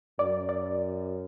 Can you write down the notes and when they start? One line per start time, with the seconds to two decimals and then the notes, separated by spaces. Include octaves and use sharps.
0.19 F#2 D5
0.49 D5